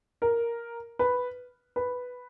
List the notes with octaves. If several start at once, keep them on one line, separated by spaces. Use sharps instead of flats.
A#4
B4
B4